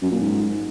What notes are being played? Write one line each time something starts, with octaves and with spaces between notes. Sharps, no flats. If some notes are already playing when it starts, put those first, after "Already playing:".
F#2
A#2
G#2